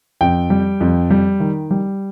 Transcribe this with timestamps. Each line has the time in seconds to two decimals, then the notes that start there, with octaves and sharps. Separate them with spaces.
0.21 F2 G5
0.50 G3
0.80 F2
1.10 G3
1.40 D#3
1.71 G3